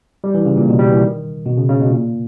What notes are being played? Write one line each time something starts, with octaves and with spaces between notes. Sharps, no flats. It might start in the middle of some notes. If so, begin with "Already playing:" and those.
G3
E3
C#3
A#2
B2
G3
E3
D#3
B2
C#3
C#3
B2
A#2